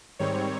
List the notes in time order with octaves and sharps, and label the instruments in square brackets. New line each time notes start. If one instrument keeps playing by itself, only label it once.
[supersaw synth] G#2 D#3 G3 C4 C#5